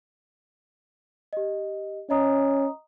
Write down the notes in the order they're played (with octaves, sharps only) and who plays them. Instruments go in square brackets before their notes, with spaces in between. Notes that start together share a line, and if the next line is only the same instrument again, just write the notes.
[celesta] G4 D#5
[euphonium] C#4 [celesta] D#5 A#5 D#6